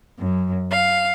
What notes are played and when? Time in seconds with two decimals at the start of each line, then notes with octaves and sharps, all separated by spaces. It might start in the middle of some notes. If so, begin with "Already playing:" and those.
0.19 F#2
0.71 F5